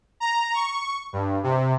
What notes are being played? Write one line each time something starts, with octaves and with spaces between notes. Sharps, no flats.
A#5
C#6
G2
C3